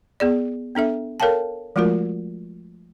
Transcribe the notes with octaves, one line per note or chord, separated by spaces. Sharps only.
B3 G#4 D5
B3 D4 A4 E5
A4 A#4 C#5 F5 G5 A5
F3 G#3 A3 F4 F#4 A#4